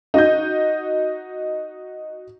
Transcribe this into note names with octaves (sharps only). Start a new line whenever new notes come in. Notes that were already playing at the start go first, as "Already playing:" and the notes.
D#4 F#4 D#5 G6